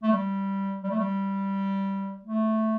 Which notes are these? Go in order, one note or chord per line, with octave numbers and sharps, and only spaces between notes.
A3
G3
G3
A3
G3
A3